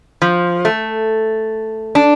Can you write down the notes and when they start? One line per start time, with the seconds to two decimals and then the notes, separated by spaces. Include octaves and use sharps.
0.22 F3
0.65 A3
1.95 D4